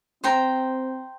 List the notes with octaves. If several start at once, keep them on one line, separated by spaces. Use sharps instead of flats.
C4 C5 G5 A#5